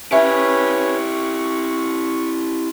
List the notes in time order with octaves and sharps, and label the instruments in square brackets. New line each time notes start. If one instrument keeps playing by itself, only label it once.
[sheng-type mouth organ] C#4 B4 C#5 [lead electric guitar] E4 G4 [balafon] E5 G#5
[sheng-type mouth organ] C#6